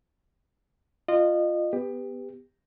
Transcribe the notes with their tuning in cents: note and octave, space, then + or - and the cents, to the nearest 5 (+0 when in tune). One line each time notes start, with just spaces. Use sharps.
F4 +0 D#5 -30
B3 +10 G4 +20